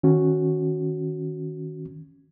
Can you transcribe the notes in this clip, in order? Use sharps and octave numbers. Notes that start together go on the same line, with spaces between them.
D#3 C#4 F#4